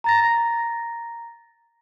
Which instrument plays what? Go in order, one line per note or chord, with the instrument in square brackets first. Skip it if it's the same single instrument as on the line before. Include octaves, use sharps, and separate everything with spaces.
[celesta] A#5 A6 A#6